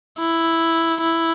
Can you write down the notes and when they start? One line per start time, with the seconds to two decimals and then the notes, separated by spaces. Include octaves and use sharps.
0.19 E4
1.01 E4